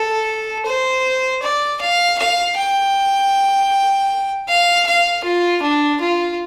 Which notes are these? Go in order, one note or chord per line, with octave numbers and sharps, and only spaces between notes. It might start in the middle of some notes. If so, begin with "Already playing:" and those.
Already playing: A4
C5
D5
F5
F5
G5
F5
F5
F4
D4
F4